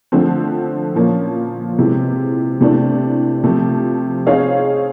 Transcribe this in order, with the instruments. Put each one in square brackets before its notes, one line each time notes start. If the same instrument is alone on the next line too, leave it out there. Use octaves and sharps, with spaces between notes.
[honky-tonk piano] D3 F3 A3 C4
A#2 F3 A#3 C#4
C3 E3 G#3
C3 E3 A3 D4
C3 F3 A3
C4 D#4 G#4 C#5 F5